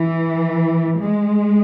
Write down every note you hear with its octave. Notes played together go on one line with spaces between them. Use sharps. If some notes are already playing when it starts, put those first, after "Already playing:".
Already playing: E3
G#3